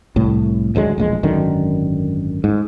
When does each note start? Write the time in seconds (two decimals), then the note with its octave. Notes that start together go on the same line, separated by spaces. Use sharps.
0.16 C2 A2
0.75 D#1 D2 F#3 G#3
0.98 E1 A#1 G#3
1.23 G#1 F#2 D3 D#3
2.44 G#2